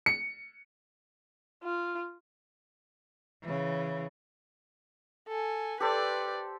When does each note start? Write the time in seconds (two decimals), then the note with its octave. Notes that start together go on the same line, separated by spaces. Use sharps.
0.06 C#7
1.64 F4
3.42 C#3 E3
5.28 A4 G#5
5.80 G4 A4 B4 C5 D5